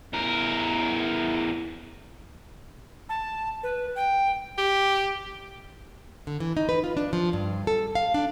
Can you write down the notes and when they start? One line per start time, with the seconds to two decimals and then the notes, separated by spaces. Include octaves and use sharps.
0.13 E2 A#4
3.09 A5
3.63 B4
3.96 G5
4.58 G4
6.27 D3
6.40 E3
6.57 D#4
6.69 B4
6.84 F4
6.97 D4
7.13 F3
7.33 G2
7.67 A4
7.95 F5
8.14 D4